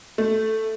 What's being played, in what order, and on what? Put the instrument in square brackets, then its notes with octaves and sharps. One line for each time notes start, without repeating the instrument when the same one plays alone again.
[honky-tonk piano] A3